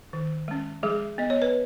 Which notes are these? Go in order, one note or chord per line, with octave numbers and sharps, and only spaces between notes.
D#3
G#3 C#4
F3 G#3 G#4
B3 D#5
C#5
B4